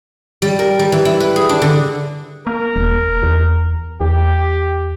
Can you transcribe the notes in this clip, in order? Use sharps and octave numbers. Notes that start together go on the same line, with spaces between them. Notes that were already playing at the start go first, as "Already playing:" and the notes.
G3
A#4
G3
E3
E4
B4
G#4
D4
D3
A#3 A#4
E1
E2
E2 G4